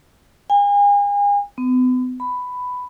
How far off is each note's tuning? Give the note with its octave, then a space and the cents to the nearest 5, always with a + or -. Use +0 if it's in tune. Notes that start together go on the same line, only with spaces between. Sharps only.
G#5 -40
B3 +40
B5 +10